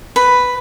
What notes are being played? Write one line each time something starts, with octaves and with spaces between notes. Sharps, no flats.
B4